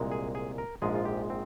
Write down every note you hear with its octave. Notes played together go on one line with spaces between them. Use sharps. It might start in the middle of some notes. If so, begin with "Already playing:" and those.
Already playing: C2 A#2 G#3
G#4
G#4
A#4
A#1 G#2 F3 G#3 G#4
F4
G4
C4